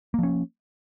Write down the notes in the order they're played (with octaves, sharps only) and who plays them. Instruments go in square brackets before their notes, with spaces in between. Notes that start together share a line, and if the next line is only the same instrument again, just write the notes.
[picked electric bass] A#3
F3
C#4